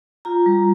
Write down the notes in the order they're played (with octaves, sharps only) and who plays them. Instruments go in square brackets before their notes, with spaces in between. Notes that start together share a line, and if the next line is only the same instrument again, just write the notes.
[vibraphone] F4 A#5
G3